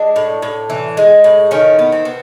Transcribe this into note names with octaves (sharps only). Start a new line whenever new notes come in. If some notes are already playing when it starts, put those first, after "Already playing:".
Already playing: G#3 D4
A2
A2
E3
G#3
A2
D#3 C#4
B3
C4
B3